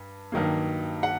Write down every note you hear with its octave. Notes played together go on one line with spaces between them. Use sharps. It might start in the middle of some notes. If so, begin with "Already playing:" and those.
Already playing: G2
G2 D#3 F#3 A#3
F#5